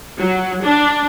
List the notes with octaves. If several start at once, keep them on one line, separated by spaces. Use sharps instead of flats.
F#3
D4